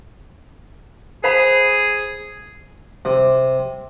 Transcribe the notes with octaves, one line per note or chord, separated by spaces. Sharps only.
G#4 C5 F5 B5
C3